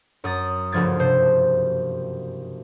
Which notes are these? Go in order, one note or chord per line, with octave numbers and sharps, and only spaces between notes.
F#2 D#6 A6
F#1 D2 G2 F3 G#6 A6
C3 C5